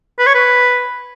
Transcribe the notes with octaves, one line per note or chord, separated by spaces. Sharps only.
B4
C#5
B4